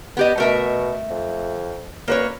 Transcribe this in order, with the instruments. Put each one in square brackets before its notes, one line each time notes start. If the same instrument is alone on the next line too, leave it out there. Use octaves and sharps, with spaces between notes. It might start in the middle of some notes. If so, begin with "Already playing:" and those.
[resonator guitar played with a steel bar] B3 G4 D#5
[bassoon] B2 [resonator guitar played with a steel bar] A3 A#4 E5
[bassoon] F2
[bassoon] F#2 [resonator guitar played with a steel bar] A#3 B4 C#5